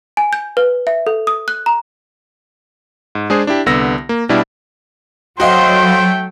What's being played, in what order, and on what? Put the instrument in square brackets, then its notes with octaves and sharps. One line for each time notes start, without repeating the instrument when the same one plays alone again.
[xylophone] G#5
G6
B4
E5
A4
D#6
F#6
A#5
[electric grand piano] G#2
G#3 D4 G#4 C5
D4 E4 G4
C2 D3 B3 E6 A#6
A#3
B2 G3 D4 E4
[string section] F#3 [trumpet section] A3 G5 [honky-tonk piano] F#4 D#5 F5 [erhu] C5